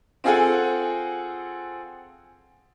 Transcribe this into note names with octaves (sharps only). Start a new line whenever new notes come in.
C4 F4 G#4 A4 F#5 G#5